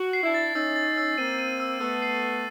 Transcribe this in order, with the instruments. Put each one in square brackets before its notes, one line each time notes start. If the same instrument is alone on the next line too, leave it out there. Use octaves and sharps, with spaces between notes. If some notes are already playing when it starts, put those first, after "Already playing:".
Already playing: [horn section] F#4
[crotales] C7
[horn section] D4 E4
[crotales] A6
[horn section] C#4 D#4 [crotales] E6
[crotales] A6
E6
[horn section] A#3 C4 [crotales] D#7
[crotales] D#7
E6
[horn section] A3 B3 [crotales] E6
[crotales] C7
E6